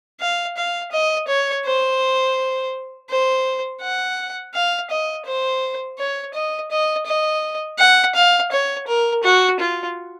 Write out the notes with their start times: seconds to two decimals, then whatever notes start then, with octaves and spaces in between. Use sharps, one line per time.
0.20 F5
0.56 F5
0.92 D#5
1.28 C#5
1.65 C5
3.09 C5
3.81 F#5
4.54 F5
4.90 D#5
5.25 C5
5.99 C#5
6.34 D#5
6.71 D#5
7.06 D#5
7.79 F#5
8.15 F5
8.52 C#5
8.87 A#4
9.24 F#4
9.59 F4